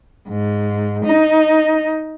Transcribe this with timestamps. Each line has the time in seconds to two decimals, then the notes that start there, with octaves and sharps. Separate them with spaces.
0.29 G#2
1.06 D#4